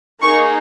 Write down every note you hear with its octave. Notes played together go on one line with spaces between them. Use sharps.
A#3 D#4 G#4 C#6